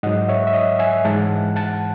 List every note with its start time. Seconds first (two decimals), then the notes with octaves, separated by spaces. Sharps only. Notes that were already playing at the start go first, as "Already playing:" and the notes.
0.03 G#2 F#3 D#5 F#5
0.28 C#5 E5
0.47 E5
0.54 D#5 F#5
0.79 E5 G#5
1.05 G#2 E3 G#3 F#5 A5
1.56 F#5 A5